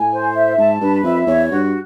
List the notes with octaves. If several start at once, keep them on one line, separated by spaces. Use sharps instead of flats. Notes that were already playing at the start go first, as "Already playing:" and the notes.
Already playing: A2 G#5
C5
E5
G#2 A5
G2 B4
F2 E5
E2 C#5
G2 F#4